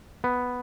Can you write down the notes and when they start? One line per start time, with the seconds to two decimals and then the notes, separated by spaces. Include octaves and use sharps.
0.24 B3